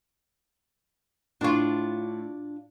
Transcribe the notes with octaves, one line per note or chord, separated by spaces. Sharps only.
A2 D4 F4 C#6